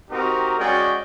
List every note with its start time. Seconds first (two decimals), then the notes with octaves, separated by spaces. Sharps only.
0.11 C4 D#4 F#4 G4 A#4
0.59 G#3 C#4 F#4 G#4 D5 G5